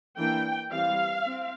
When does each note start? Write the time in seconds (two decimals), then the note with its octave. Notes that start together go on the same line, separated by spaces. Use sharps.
0.18 E3 A#3 D4 G5
0.72 E3 G3 C4 F5
1.25 C4